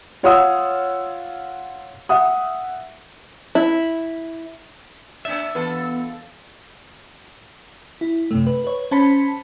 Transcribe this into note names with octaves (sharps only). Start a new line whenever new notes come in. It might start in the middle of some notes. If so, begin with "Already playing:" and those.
F4 C#5 F5 F#5 D#6 E6
E5 F#5 D#6
E4
A#3 D4 D5 E5 E6
E3 B3 F4 A4
E4
F#2 C3 A3
B4
B4 C#5
C#4 C5 A5 B5 B6 C#7